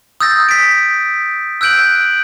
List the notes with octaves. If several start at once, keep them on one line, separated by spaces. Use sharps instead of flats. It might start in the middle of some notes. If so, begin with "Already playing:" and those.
D#6 E6 G6 A6 A#6
B6 D7
E6 F#6 G6 D7 F#7